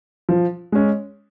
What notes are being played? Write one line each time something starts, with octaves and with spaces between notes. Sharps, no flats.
F3
G#3 C#4